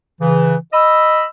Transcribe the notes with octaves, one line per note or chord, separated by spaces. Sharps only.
C#3 E3
D#5 B5 E6